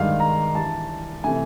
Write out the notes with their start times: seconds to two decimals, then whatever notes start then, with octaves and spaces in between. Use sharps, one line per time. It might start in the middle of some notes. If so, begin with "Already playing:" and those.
Already playing: G2 D#3 G#3 F5
0.20 A#5
0.55 G2 E3 G3 A5
1.24 C3 E3 A3 G#5